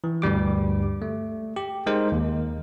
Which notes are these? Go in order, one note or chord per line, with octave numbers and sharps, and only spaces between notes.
E3
D2 G2 G3 D6
A3
G4
G#3 D#4 A#4 C5
D#2